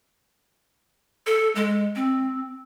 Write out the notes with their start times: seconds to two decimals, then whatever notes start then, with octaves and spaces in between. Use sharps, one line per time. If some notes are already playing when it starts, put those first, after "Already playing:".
1.27 A4
1.55 G#3
1.96 C4